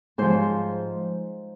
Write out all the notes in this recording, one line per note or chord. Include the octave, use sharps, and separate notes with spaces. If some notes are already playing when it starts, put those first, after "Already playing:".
G#2 F3 C5